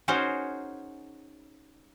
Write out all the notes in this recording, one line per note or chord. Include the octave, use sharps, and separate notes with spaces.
C#4 D#4 F#4 G#4 A#4 C5